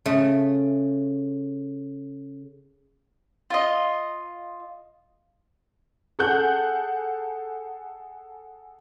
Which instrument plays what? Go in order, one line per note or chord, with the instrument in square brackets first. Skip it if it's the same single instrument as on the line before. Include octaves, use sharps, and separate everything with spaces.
[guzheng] C#3 A3
[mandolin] F4 D#5
[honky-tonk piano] G#4 A4 F#5 F#6 G6